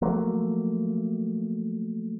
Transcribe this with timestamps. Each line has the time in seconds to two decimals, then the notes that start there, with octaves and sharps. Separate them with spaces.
0.02 F3 F#3 A3 A#3